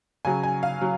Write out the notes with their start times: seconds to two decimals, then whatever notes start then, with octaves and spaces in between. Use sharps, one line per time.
0.25 C#3 F#3 G#5
0.43 G#5
0.63 F5
0.81 F#3